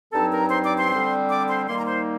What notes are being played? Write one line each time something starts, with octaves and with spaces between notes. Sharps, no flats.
G2 F#3 C4 D#4 A4 A5
A#4 A#5
C5 C6
D5 D6
C5 C6
D3 G3 C4
D5 D6
C5 C6
D#3 G3 A#3 D#4 C6
A#5
C5 C6